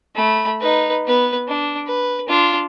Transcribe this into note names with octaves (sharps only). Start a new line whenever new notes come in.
A3 B5
D#4 B4
B3 B4
D4
B4
D4 F4